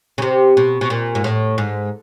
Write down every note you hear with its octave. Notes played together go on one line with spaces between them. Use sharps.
C#3
C3
B2
B2
A#2
G#2
A2
G#2